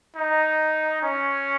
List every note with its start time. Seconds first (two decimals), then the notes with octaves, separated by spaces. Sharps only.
0.16 D#4
1.03 C#4